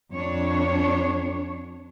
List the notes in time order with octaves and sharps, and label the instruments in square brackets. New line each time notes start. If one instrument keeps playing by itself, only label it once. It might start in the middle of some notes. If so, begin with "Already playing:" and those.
[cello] F2 [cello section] D4 C#5